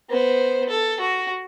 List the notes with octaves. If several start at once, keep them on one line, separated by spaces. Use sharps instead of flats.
B3 C5
A4
F#4